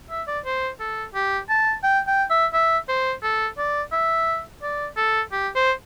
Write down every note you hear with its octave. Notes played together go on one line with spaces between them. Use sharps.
E5
D5
C5
A4
G4
A5
G5
G5
E5
E5
C5
A4
D5
E5
D5
A4
G4
C5